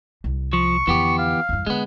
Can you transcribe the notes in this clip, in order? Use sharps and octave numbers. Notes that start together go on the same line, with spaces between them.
C2
F3 C#6
F2 D3 E3 B3 G4
F5
E2 G2
D3 G#3 B3